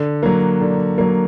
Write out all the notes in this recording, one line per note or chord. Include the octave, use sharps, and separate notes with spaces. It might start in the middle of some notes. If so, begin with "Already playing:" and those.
Already playing: D3
F#3 A#3
D3
F#3 A#3